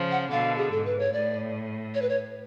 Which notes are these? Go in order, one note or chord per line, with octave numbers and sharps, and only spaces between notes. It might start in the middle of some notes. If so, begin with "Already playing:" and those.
Already playing: C#3 F3
F#5
B2 D3 F5
G#4
G#2 A4
B4
C#5
A2 D5
C#5
B4
C#5